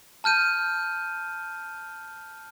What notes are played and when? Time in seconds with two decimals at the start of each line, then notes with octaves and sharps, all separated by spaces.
0.24 A5 F6 G6 D#7